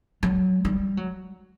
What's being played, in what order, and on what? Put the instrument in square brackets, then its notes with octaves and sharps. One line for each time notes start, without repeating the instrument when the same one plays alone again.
[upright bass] F#3
G3
F#3